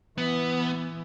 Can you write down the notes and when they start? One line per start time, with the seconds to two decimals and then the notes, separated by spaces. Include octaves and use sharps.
0.18 E3 B3